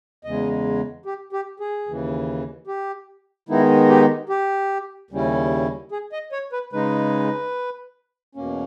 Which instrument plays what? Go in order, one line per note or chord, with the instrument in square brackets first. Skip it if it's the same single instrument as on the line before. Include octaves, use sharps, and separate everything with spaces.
[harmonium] E2 C#3 G#3 D#5
G4
G4
G#4
D#2 C#3 E3
G4
D#3 G#3 B3 D#4 E4
G4
G4
D#2 C#3 G3 C#4 E4
G#4
D#5
C#5
B4
C#3 G#3 D#4 B4
E2 B2 A#3 C#4